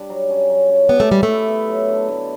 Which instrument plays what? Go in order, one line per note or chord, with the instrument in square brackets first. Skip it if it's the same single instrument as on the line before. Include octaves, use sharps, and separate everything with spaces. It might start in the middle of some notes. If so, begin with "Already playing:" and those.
Already playing: [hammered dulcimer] G3 D4
F#3
C#4
F#3
C#4
[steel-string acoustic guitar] B3 [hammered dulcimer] G4
[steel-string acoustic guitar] A3
[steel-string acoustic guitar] G3 [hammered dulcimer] G4
[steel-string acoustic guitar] A3
[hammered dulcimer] E4
B3
F#3
D3
D3